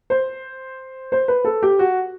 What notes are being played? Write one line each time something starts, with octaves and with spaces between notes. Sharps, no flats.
C5
C5
B4
A4
G4
F#4